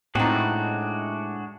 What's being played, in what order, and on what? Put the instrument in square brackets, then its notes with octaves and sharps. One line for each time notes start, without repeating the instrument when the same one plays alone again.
[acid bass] A2 [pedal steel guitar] G#3 D4 F#4 [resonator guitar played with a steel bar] C4 D#4